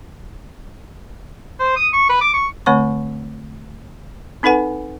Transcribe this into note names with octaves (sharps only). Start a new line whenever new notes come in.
C5
D#6
C#6
B4
D6
C#6
D3 A3 C4 C#5 C#6
C4 D#4 A4 B4 F#5 G#5